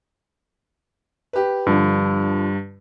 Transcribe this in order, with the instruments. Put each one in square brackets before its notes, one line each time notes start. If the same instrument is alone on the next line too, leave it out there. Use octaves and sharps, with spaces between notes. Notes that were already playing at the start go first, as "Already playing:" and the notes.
[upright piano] G4 B4
[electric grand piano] G2 [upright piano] D3 F3